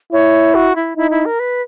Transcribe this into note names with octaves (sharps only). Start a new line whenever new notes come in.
E4 C#5
F#4
E4
D#4 E4
E4
A#4
B4